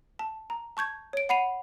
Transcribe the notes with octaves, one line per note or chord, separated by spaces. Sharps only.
A5
A#5
A5 C#6 G6 G#6
C#5 D7
F#5 B5 C7 D#7 F7